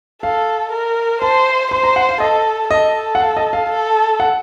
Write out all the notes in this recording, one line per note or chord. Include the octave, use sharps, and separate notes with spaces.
A4 F5
A#4
C5 A5
C5 C6
A#5
F#5
F5
A4 D#5
A4 D#5
F#5
F5
D#5
F5
A4
F#5